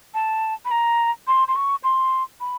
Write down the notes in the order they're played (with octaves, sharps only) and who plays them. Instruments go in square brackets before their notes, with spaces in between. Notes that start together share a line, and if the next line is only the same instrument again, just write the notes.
[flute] A5
B5
A#5
C6
C6
C#6
C6
B5